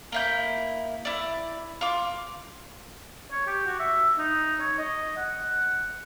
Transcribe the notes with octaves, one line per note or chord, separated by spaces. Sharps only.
A#3 E4 G6
E4 D5
F4 D6
C#5
G4
F#4
E5
D#4
C#5
D#5
F#5